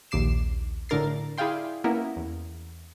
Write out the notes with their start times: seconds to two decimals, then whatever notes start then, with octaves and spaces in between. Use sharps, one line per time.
0.11 A#1 D#2 D6 C7 E7
0.89 A2 D3 D4 A#4 A6 C7
1.38 E4 G#4 D5 F5 G5 C6
1.84 A#3 B3 C#4 E4 A#4
2.16 E2